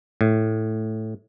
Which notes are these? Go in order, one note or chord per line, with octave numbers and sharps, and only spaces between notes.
A2